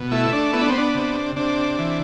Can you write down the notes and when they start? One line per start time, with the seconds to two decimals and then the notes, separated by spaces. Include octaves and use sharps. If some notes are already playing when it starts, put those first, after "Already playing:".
Already playing: B2
0.11 A3 E4
0.32 D4
0.53 B3 E4
0.61 D4
0.69 C4
0.77 D4
0.95 C3
1.36 C3 D4
1.78 E3